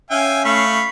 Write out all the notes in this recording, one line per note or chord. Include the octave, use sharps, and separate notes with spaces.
C#4 E5 F5 G5 G#5
A3 F5 B5 C#6